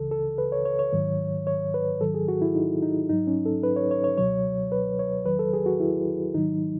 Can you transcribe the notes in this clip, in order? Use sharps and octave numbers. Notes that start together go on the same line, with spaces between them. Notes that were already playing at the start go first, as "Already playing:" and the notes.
Already playing: C#2 C#3 E3 A4
A4
B4
C#5
C#5
C#5
G#2 D#3 F#3
C#5
B4
G#2 D#3 F#3 A4
G#4
F#4
E4
D#4
D#4
G#2 F#3 D#4
C#4
A4
B4
C#5
C#5
C#5
C#2 B2 F#3 C#5
B4
C#5
E2 D#3 F#3 B4
A4
G#4
F#4
E4
G#2 D#3 F#3 D#4